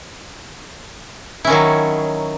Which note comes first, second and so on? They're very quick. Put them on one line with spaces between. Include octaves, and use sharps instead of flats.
E4 C#4 D#3 F#3